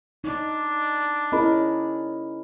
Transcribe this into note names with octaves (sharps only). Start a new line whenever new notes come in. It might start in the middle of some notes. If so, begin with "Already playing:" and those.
D4 D#4
C#4 E4 G#4 A#4 D#5 B5